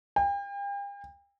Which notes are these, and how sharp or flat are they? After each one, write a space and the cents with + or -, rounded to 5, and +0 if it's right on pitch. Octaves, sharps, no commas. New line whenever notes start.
G5 +40